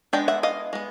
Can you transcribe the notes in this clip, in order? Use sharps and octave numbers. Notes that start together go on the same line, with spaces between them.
G#3 B3 D4 G5
E5 F#5
D#5 F5
G#3 B3